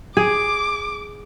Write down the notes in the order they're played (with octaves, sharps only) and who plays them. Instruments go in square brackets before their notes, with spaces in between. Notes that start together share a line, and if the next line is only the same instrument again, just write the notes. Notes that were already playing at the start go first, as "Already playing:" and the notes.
[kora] G#4 [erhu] D6